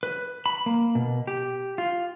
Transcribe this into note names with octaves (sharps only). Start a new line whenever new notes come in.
B4
B5
A#3
B2
G4
F4